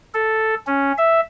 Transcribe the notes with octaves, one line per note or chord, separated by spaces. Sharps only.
A4
C#4
E5